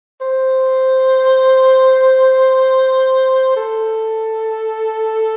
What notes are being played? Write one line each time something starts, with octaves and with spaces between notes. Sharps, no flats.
C5
A4